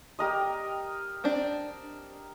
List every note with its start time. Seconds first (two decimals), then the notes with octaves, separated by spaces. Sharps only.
0.19 G4 A#4 D#5
1.24 C4 D4